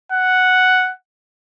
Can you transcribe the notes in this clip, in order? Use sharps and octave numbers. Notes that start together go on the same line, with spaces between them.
F#5